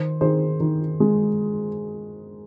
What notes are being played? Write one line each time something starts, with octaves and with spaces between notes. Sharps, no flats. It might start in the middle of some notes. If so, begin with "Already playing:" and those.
Already playing: D#3 C5
D#3 G#4 C5
D#3
G#3